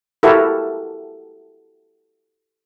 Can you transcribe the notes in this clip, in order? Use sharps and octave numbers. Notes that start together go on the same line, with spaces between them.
E4 F#4 G4 A4 A#4